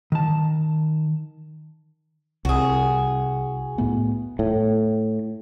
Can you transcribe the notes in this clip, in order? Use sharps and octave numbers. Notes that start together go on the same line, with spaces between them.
D#3 A5
C2 F#4 G#4
A2 A3 B3
A2